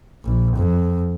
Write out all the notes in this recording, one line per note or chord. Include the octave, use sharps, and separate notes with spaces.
A#1
F2